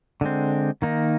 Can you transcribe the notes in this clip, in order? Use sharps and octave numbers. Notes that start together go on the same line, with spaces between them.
D3 G#3 C4
D#3 A#3 D#4